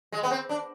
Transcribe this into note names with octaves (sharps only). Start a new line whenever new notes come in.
G#3
B3
C4
D4